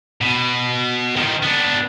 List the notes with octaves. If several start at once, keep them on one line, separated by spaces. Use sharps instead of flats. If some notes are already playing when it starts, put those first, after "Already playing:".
B2
D#3 F3
B3 D4